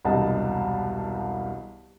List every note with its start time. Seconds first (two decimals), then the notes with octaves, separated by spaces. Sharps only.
0.05 E1 C2 G2 D#5 A5